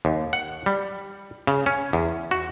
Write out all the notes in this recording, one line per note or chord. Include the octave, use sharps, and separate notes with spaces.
D#2
F#5
G3
C#3
C#4
E2
F#4